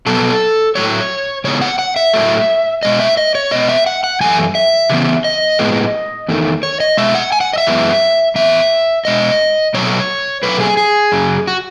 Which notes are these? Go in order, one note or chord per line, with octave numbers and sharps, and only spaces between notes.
B2 F#3 B3 A4
A2 F#3 A3 C#5
C#3 E3 G#3 B3 C#5
F#5
F#5
E5
A2 F#3 A3
B2 G#3 D#5
E5
D#5
C#5
B2 G#3 B3 D#5
E5
F#5
F#5
F#2 E3 A3 G#5
E5
C#3 E3 B3
D#5
A2 G#3 B3
E2 D#3 A3
C#5
D#5
B2 G#3 E5
F#5
G#5
F#5
D#5
E5
F#2 E3 G#3 B3
A2 E3 B3 E5
B2 G#3 D#5
B2 F#3 A3 C#5
B2 F#3 A3 B4
G#4
G#4
F#2 C#3 F#3
F#4